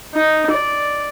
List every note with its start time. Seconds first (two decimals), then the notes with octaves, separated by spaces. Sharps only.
0.15 D#4
0.51 D5